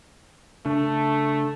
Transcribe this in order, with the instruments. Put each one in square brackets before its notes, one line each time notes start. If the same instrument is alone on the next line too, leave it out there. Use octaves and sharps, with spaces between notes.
[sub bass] C#3 [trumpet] A3 [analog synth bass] D4